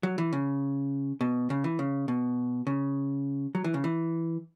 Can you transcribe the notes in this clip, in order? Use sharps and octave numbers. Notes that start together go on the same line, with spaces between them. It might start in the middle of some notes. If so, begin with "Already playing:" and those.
F#3
E3
C#3
B2
C#3
E3
C#3
B2
C#3
F#3
E3
C#3
E3